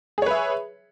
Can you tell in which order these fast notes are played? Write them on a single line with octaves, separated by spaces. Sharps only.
G#4 C#5 B4 E5